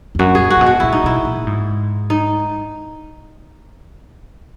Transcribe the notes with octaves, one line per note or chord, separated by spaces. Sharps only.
E2
F#2 F#4
G#4
A#2
F#4
A#2
B2
F#4
A#2 E4
D#4
B2 E4
A#2
A#2
G#2
D#4